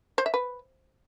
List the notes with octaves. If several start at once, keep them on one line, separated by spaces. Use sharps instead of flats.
C5
E5
B4